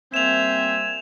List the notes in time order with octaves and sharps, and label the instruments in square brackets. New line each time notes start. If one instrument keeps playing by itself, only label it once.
[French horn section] G3 A#3 C4 [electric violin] C5 E5 [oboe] G#5 [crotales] E7 F7